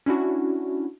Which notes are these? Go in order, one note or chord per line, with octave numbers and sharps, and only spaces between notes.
C#4 D4 E4 F#4